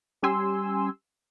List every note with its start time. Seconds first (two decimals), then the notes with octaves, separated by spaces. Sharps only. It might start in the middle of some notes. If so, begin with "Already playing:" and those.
0.22 G3 C#4 G4 G#5 C6 E6